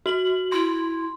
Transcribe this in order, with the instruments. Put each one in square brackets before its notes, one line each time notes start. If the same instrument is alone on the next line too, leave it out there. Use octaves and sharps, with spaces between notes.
[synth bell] F#4 F#7
[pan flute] E4 [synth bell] C6